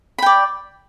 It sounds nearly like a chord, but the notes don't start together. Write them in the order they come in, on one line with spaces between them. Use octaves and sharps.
B5 G5 D5